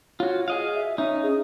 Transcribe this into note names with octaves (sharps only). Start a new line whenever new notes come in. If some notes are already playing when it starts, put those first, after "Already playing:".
F4 F#4 C#5
G#4 D#5 F5
E5
C#4 D#4 E5
G#4